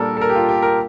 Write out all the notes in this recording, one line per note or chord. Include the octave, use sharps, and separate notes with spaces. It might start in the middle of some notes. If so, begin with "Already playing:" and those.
Already playing: A#2 G3 D4 A4 A#4
A4
A#4
G4
F4
G4
A#4